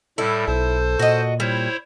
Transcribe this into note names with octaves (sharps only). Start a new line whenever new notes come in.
A2 G3 E4 A4
B1 A4 C5
A#2 F#4 D#5
G3 E4 C5 C#5